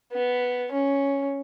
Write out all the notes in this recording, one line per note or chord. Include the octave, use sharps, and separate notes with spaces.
B3
C#4